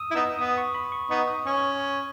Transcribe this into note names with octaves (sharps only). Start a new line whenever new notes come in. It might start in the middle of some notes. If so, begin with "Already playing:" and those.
Already playing: D#6 E6
E4
B3 D#4 E6
B3 D#6
C#6
B5
C#6
B3 D#4 C#6
D#6
C#4 C#6